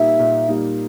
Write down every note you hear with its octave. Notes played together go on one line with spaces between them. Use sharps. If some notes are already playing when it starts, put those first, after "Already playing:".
Already playing: A#2 G3 A#3 D#4 E5
A#2
G3 A#3 D#4